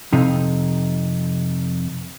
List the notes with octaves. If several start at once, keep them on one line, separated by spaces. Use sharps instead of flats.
F2 C3 D#4